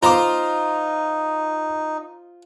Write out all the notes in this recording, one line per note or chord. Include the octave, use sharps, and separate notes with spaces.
D#4 F4 C5 A#5 C6 D6